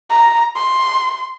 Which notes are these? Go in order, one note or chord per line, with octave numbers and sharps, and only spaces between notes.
A#5
C6